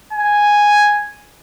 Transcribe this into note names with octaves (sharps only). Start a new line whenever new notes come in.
G#5